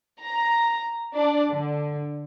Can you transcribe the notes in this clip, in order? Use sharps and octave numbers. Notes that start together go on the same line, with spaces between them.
A#5
D4
D3